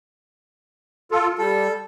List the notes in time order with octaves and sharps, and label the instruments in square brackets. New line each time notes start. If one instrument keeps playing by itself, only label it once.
[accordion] F4 A4
[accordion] G3 [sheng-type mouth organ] A4